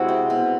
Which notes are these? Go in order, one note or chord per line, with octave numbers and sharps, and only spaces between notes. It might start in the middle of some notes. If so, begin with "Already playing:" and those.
Already playing: C3 G#3 E4 F#4
C4
B2